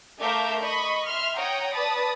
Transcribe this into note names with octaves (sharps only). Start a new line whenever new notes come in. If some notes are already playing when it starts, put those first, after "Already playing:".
A3 A#4 E5 F5 D6 G6
D#5 B5 C#6
E5 C6 F6
C#5 F#5 G5 A#5 D#6
B4 D5 A5 B5 D#6 A6